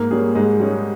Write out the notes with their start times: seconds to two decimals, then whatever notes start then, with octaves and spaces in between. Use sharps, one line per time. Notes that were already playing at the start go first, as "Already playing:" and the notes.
Already playing: G#2 A#3
0.11 G3 C#4 G#4
0.35 G#2 G#3
0.60 G3 C#4 G#4